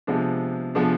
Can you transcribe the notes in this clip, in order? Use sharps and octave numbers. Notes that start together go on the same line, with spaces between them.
C3 F3 G#3 B3 D4
C3 F3 G#3 B3 D4